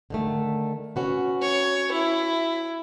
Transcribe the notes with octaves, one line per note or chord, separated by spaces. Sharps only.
D3 D#3 A3
C#4 F#4 B4
C#5
E4